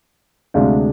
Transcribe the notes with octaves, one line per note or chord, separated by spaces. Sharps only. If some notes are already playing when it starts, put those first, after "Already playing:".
D2 C3 G#3 D4 F5